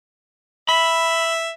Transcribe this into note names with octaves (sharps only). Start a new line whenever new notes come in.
E5 B5